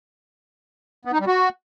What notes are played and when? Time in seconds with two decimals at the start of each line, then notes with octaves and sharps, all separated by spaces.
1.05 B3
1.13 D#4
1.20 G3
1.27 F#4